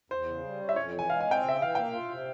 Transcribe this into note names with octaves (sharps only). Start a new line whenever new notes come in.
E2 C5
C#3
G3
C#4
E5
F2 C#5
E3
G#5
G#3 F5
G#5
C4 G5
C#3
E5
E3 F5
A#3 G5
F4
C3